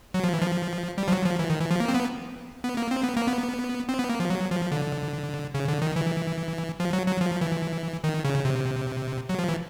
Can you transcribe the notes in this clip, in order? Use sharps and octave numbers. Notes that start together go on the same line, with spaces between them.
F#3
F3
E3
F3
G3
F3
F#3
F3
E3
D#3
E3
F3
A#3
C4
B3
B3
A#3
C4
B3
A#3
B3
C4
B3
A#3
F3
F#3
F3
D3
C#3
D3
D#3
E3
F3
F#3
F#3
F3
E3
D#3
C#3
C3
F#3
F3
E3